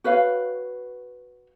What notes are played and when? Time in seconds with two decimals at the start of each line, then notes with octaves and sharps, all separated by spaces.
0.04 F#4 B4 C#5 F5